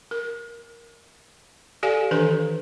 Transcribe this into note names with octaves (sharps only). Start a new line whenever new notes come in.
A#4
G4 A4 D5 F5 G#5
D#3 E3 D4 A4 B4